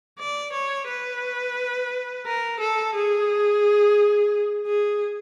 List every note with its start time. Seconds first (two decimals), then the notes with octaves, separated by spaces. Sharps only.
0.20 D5
0.53 C#5
0.88 B4
2.26 A#4
2.60 A4
2.95 G#4
4.66 G#4